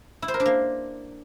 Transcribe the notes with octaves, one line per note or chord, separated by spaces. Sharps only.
E4
C5
A#4
D4
A#3